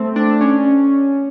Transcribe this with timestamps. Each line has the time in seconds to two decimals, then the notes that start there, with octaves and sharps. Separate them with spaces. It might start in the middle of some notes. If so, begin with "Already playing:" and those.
Already playing: A3 C4
0.16 D4
0.41 C#4